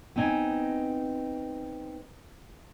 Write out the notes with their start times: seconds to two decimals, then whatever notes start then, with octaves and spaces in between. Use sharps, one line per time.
0.16 B3 C4 D#4 G#5